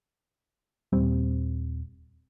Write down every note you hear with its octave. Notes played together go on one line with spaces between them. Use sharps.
D#1 G3 C4